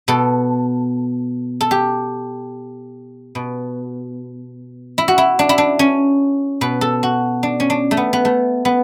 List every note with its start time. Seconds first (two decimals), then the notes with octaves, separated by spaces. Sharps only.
0.08 B2 A4
1.61 A4
1.71 G4
3.35 B2
4.98 E4
5.08 F#4
5.18 E4
5.39 D4
5.49 E4
5.58 D4
5.79 C#4
6.61 B2 B4
6.81 A4
7.03 F#4
7.43 D4
7.60 C#4
7.70 D4
7.91 A3
7.97 B3
8.13 B3
8.25 A3
8.65 B3